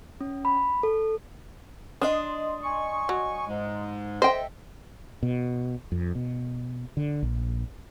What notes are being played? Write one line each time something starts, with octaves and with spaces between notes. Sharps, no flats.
C#4
B5
A4
D4 D#5 C6 D#6
G#5 C#6
F#3
G#2 G#3
A4 C5 D#5 E5 G5
B2
F2
B2
D3
A#1